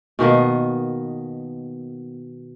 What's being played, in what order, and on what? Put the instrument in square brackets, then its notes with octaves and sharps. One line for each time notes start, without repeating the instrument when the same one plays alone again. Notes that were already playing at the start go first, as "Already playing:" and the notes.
[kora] B2 D#3 A#3 B3